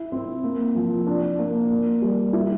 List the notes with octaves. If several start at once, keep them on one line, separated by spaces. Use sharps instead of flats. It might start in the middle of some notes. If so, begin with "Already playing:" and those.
Already playing: E4
C4
A#3
F3
D4
A#3
A#3
G3
E4